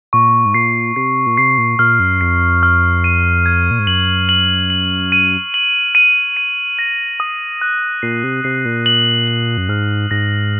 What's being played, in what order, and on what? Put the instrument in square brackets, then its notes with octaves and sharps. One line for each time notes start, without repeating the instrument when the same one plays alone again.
[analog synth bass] A#2 [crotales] C#6
[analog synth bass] G#2
[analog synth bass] A#2 [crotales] C7
[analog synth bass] C3 [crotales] C7
[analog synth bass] A#2
[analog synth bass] C3 [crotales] C7
[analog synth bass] A#2
[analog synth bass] A#2 [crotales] F6
[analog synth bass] F#2
[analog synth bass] F2 [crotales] C7
[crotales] F6
D#7
G#6
[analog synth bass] A#2
G#2
[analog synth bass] F#2 [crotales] F#7
[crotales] F#7
F#7
D#7
F#7
D#7
D#7
A#6
D#6
F#6
[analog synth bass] A#2 [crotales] C7
[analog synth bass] C3
[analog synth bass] C3 [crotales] C7
[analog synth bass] A#2
[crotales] F#7
F#7
[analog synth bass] F#2
[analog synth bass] G#2 [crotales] F6
[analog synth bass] G#2 [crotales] A#6